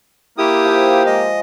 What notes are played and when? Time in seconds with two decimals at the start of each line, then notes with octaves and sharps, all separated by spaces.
0.38 A#3 E4 G4 D#6
0.65 F3
1.06 G#3 D#5